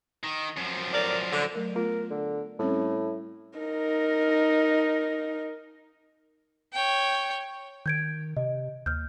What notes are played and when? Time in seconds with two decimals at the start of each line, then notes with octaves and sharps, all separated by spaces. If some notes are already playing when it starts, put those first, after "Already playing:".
0.23 D#3
0.57 F#2 F3
0.93 A2 A#4 D5
1.32 D3
1.54 F#3 A3 A#4
1.75 A3 B3 F4 A#4
2.10 D3
2.59 A2 G3 C4 C#4
3.59 D#4 A#4
6.73 C#5 G5
7.86 D#3 G6 G#6 D7
8.37 C3 D#5
8.86 D#2 F6 G6